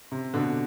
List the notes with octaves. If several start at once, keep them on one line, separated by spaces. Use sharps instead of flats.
C3
B2 D3